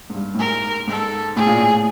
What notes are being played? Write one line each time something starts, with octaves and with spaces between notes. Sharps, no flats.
G#2
G2
A2
G#2 A#4
G#2 A4
A2 G#4
A#2
A2